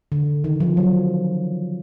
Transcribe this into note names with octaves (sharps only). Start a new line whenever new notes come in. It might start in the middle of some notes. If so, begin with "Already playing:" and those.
D3
D#3
F3
F#3